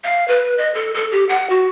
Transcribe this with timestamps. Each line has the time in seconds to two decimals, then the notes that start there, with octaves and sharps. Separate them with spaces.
0.04 F5
0.28 B4
0.58 D#5
0.74 A4
0.94 A4
1.12 G4
1.29 F#5
1.50 F#4